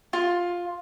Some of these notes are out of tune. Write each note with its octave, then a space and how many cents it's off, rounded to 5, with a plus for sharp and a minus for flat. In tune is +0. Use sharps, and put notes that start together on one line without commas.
F4 +10